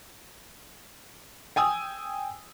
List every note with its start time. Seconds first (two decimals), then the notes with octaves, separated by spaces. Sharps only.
1.56 G5 G#5 D#6 E6